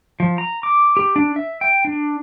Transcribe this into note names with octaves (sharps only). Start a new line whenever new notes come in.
F3
A#5
D6
G4
D4
E5
G5
D4